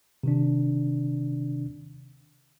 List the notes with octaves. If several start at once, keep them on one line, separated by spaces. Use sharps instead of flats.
C3 D#3 D4